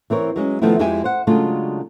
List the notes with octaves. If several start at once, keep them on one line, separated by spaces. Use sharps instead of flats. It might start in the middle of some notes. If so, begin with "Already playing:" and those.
E3 C4 A#4 C#5
F#3 G#3 C#4
D#3 F3 A3 B3 C4 E4
F2 G#3 E4 G4 G5 G#5
C5 F#5
C#3 F#3 G#3 A3 D4 F4